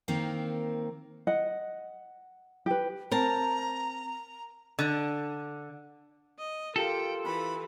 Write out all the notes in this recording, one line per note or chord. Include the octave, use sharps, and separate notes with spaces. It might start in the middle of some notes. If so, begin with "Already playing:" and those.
D#3 A#3 C4
D#5 F#5
G4 B4
C4 A#4 A5 A#5
D3
D#5
F4 G4 A4 A#4 G5
E3 B5